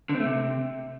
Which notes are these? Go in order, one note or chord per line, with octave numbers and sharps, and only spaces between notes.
D3
C4
A3
C3